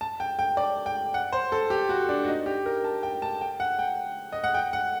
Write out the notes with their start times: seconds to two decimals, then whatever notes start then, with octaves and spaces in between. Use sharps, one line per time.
0.01 A5
0.20 G5
0.39 G5
0.57 D5
0.86 G5
1.14 F#5
1.32 C5
1.52 A4
1.70 G4
1.89 F#4
2.09 D4
2.24 F#4
2.27 D#4
2.46 G4
2.66 A#4
2.84 A5
3.03 G5
3.22 A5
3.41 G5
3.60 F#5
3.79 G5
4.32 D#5
4.44 F#5
4.54 G5
4.73 F#5